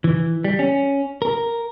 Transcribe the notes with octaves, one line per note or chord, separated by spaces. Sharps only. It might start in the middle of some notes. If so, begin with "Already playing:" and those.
E3
G3
C#4
A#4